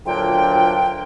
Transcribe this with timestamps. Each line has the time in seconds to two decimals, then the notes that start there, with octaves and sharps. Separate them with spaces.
0.06 D2 A#2 F#3 D4 F4 G5